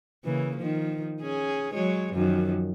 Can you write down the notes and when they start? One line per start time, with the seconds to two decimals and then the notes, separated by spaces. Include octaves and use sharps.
0.25 C#3 E3 A#3
0.57 D#3 F3
1.21 C#4 G#4
1.74 F#3 G#3 C#5
2.13 F#2 D#3 F3